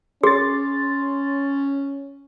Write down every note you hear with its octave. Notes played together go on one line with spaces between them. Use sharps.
C#4 G#4 C6 A6